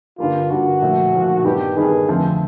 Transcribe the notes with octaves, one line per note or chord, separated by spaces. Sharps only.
G2 D3 G3 A#3 F4
G2 D3 G3 A#3 F#4
A#2 F3 A3
A#2 F3 A3
G2 D#3 G3 B3 G4
G2 D#3 G3 B3 G#4
F2 D3 F3 A3 C4